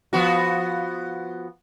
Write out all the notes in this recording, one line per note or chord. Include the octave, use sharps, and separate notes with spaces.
F3 B3 F#4